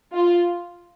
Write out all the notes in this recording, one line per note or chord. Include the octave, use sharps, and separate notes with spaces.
F4